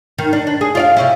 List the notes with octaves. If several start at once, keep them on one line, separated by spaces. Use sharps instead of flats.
D#3
D4
D4
G#4
F4 D5 F5
C3 C#4 E4